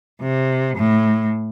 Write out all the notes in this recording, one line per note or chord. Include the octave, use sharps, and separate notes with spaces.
C3
A2